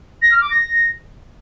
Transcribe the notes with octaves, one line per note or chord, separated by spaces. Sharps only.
A#6
F6
D6
A#6